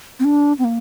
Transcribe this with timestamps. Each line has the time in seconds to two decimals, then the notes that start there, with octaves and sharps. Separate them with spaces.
0.19 C4
0.25 D4
0.59 C4
0.64 A#3